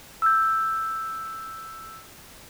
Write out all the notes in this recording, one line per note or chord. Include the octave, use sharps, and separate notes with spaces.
E6 G6